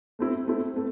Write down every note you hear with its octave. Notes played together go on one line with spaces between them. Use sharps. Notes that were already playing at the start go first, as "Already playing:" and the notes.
A3 C4 E4
A3 C4 E4
A3 C4